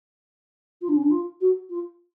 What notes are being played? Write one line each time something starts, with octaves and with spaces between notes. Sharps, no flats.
F4
D4
C#4
D4
F4
F#4
F4